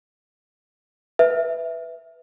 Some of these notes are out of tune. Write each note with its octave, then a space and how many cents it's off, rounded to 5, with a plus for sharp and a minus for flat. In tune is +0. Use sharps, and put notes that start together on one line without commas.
B4 +5 E5 +0